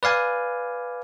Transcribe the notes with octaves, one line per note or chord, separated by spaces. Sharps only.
B4 D5 F5 G#5